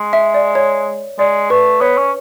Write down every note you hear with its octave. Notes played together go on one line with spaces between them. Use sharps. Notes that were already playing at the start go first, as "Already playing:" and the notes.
Already playing: G#3
E5
D5
C#5
G#3 D5
A3 B4
B3 C#5
C#4